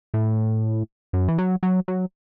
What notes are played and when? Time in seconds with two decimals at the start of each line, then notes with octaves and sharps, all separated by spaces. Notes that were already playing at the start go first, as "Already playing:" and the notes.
0.14 A2
1.13 F#2
1.28 E3
1.38 F#3
1.63 F#3
1.88 F#3